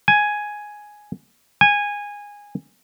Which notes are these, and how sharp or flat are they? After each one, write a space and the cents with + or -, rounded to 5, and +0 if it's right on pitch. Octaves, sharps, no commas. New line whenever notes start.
G#5 +5
G#5 -15